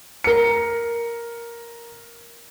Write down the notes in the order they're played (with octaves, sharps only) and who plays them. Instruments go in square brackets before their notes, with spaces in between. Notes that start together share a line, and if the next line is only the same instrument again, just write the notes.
[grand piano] A#4 C#7